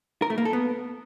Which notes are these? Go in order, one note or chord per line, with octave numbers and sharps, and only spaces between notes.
A#4
A3
A#3
A4
B3